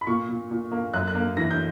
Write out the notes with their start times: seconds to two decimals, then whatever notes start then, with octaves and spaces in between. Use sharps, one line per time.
0.01 B5
0.07 A#2 C#6
0.29 A#2
0.51 A#2
0.72 A#3
0.94 F#2 F#6
1.08 F#6
1.15 A#3
1.37 E3 A#6
1.51 G6